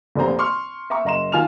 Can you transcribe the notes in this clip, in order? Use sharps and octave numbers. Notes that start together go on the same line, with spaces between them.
F1 A#1 C3 C5 A#5
C6 C#6 F6
E5 G5 A#5 C#6
F#1 D#5 A#5 C6 E7
D#3 F4 G#5 F6 F7